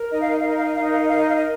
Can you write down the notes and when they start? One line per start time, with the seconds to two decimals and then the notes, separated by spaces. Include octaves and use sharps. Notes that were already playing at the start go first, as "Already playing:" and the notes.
Already playing: A#4
0.11 D#4 D#5
0.20 F5
0.29 D#5
0.39 F5
0.46 A#4 D#5
0.56 F5
0.64 D#5
0.73 F5
0.80 D#4 D#5
0.91 F5
1.00 D#5
1.09 F5
1.13 A#4 D#5
1.27 F5
1.35 D#5